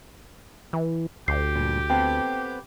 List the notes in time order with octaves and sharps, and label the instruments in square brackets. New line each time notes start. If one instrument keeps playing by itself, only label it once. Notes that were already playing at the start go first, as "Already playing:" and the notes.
[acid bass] E3
[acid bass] D2 [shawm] G4 [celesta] C7
[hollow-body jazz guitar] G2 A#2
[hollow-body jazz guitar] B3 C4 A4 [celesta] G5